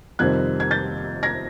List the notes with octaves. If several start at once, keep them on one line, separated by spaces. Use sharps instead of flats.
F2 C3 D#3 G3 C4 F#6 G#6
G#6
G6 A6
G#6 A#6